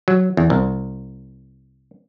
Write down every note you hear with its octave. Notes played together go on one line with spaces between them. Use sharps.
F#3
E2
C2